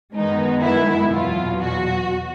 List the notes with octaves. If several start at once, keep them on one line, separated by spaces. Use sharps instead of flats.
F#2 D#3 G#3 B3 D#4
E4
E2 B2 F#3 F4
F#4